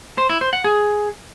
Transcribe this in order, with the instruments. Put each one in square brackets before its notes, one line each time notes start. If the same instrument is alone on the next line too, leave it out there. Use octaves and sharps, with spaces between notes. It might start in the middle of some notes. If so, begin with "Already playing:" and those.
[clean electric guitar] C5
E4
C5
F#5
G#4